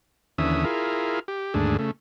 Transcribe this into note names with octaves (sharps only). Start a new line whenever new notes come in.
D#2 D3 E3 C#4 E5 D#6
E4 F4 G#4 A#4
G4
D#2 G#2 D3 A3 D4 G#4
C#3 A3